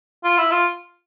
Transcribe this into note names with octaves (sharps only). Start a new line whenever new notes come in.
F4
E4
F4